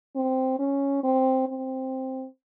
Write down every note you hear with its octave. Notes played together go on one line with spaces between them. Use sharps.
C4
C#4
C4
C4